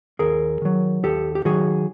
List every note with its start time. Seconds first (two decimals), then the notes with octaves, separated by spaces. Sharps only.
0.19 D#2 G#4 A#4
0.62 D#3 F#3
1.03 D#2 G4 A4
1.35 G4
1.45 D#3 F#3 F#4 G#4